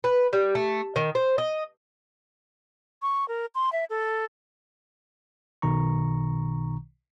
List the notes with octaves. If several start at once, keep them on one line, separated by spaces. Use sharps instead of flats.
B4
G3
A3
D#3
C5
D#5
C#6
A#4
C6
E5
A4
B1 B2 D#3 A#5 C#6